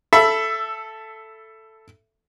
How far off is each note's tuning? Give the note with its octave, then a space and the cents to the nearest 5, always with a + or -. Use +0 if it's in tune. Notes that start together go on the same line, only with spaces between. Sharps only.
A4 +0 E5 +15 B5 -10